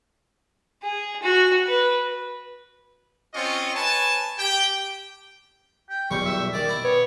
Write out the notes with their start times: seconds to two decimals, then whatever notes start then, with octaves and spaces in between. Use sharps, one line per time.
0.82 G#4
1.22 F#4
1.67 B4
3.33 C4 C#4 F4 D#5 C#6
3.75 B4 C#5 G#5 A5
4.38 G4 G5
5.90 G5
6.11 B1 E2 G3 C#6
6.25 E5
6.53 D#3 D5
6.69 E4
6.84 B3 C#5